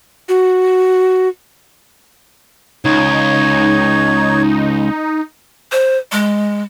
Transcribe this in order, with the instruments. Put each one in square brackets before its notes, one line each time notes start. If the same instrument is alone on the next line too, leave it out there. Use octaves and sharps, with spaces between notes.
[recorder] F#4
[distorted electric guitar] C#2 [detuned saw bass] D#4 [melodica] C#5
[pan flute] C5
G#3